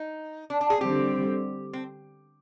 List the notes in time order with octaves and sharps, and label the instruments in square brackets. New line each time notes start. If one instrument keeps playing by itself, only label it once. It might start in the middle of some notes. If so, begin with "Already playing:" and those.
Already playing: [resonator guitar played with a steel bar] D#4
D4
D4
G#4
[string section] D3 G3 C4 [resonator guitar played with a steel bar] G4
[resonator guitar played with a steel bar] C4